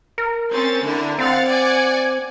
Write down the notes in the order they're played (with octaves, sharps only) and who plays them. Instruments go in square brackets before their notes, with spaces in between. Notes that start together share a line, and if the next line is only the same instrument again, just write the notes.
[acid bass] A#4
[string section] C4 C#4 A6
D3 E4 A#4
[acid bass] C4 [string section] F5 F#5 A6
[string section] D5 F#5 G#5